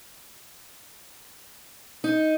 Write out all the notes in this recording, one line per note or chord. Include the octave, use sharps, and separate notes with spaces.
D#4